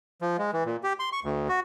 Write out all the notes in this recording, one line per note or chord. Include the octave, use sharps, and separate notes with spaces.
F3
G#3
E3
A#2
G4
C6
C#6
D2
F#4